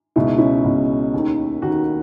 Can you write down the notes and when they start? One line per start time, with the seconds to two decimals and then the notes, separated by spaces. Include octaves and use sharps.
0.16 C#2 B2 E4
0.27 D#4
0.38 C#4 E4
0.64 C#2 B2
1.14 D#2 D#3
1.62 D#2 D#3 D#4 F#4